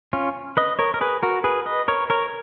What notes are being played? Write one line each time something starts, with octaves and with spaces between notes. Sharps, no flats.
C#4 F4
B4 D#5
A#4 C#5
A#4
G#4 B4
F#4 A#4
G#4 B4
B4 D#5
A#4 C#5
A#4 C#5